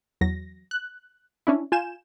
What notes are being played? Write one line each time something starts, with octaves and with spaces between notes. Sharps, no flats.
E2 F#3 A#6
F#6
C#4 D4 E4
F4 G#5 G6 E7